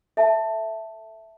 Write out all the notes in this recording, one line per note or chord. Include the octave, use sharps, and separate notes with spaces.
A4 E5 A5